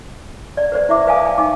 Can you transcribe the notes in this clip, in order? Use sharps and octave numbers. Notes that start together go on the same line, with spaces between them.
D5
B4 C5 D5
E4 E5 D6
B4 F5 G#5 A5 D#6
G5
D#4 G#5 D6